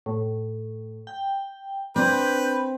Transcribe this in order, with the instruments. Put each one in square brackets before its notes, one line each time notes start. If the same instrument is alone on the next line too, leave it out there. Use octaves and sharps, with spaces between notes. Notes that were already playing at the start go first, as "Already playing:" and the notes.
[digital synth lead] A2
G5
[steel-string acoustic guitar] C4 [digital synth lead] D4 [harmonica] B4 [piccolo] G6